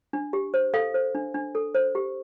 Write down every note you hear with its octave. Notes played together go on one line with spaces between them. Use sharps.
D4
G4
C5
A4 F5
C5
D4
D4
A4
C5
G4